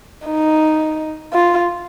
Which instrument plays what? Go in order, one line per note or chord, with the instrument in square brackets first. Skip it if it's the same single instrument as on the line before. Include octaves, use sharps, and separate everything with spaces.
[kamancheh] D#4
F4